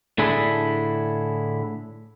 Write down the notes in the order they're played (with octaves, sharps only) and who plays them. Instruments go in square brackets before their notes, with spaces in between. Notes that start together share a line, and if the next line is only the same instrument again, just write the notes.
[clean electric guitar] A2 D3 D4 E4 G#4